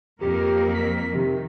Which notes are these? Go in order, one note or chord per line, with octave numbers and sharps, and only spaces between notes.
F2 A#3 G4 A#4
B6
C3 D#3